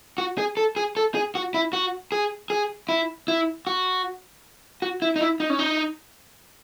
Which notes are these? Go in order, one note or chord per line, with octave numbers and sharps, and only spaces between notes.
F#4
G#4
A4
G#4
A4
G#4
F#4
E4
F#4
G#4
G#4
E4
E4
F#4
F#4
E4
D#4
E4
D#4
C#4
D#4